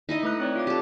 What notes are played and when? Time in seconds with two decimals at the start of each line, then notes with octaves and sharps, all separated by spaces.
0.09 D#4 E4 D#5
0.23 A3 B4 F#6
0.40 C4 C#5 D5
0.56 F4 F5 D6
0.67 G4 A4